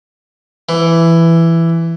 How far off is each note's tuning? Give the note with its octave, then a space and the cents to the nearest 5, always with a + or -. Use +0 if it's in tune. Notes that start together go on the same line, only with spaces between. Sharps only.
E3 +10